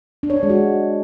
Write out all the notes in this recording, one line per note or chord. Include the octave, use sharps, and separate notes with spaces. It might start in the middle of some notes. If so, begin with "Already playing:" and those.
D4
C#5
D4
G#3
F#4